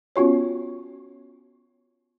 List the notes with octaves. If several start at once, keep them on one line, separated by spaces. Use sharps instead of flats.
B3 C#4 F4 F#4 C#5